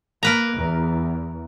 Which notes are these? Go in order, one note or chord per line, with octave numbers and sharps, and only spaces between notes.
A#3 A#4 B4 A#5
E2